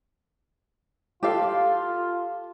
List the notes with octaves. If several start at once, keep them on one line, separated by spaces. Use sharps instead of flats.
F4 G4 A4 F5